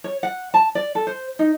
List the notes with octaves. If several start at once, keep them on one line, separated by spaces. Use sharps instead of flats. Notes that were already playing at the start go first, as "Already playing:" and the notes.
C#5
F#5
A5
D5
A4
C5
D#4